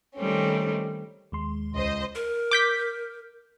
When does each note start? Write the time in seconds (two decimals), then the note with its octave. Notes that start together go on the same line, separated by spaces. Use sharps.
0.16 D#3 G3 A3 C4 C#4
1.32 D#2 G#3 C6
1.76 C#2 C5 D#5
2.15 A#4
2.51 D6 G6 B6